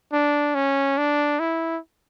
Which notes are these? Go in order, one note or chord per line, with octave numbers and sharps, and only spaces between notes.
D4
C#4
D4
E4